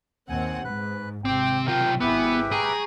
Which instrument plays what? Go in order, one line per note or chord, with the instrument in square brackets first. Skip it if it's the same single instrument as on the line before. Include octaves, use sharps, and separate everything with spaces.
[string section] D#2 C4 F#5 [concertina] G#5
[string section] G#2 [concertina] B4 F#6
[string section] G#1 C3 [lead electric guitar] C4 [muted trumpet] G5 [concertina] D6
[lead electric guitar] B1 F4 [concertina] A#4 [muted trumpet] G5
[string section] G#1 G#4 [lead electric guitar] B3 [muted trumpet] E4 [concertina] G4 B4 E5
[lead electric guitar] G#4 [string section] G5 A#5 C#6